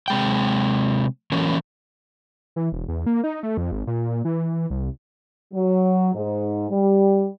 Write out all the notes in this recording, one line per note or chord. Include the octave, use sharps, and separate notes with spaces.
C3 G#3 G5
E3 F#3 A#3 C#4
E3
E1
E2
A#3
D#4
A3
F2
G#1
A#2
E3
C2
F#3
G#2
G3